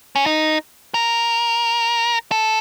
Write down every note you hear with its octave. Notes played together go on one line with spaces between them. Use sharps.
C#4
D#4
A#4
A4